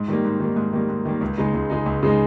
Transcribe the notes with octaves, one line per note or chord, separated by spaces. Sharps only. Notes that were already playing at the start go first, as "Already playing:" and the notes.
Already playing: G#2
D#3 G3 A#3
G#2
D#3 G3 A#3
G#2
D#3 G3 A#3
G#2
D#3 G3 A#3
C#2
C#3 G#3 D#4
C#2
C#3 G#3 D#4
C#2
C#3 G#3 D#4